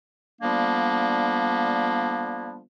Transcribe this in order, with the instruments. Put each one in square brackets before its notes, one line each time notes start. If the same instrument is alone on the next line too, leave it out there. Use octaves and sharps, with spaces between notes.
[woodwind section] D3 F3 G3 A#3 B3 D4